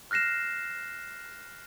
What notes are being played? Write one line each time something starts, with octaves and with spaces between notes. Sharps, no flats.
F6 F#6 A#6 C7 E7